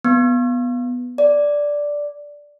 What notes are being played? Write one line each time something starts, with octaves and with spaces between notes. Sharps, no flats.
B3
D5